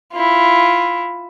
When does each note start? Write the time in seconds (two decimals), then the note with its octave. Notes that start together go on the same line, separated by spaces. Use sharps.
0.12 E4 F4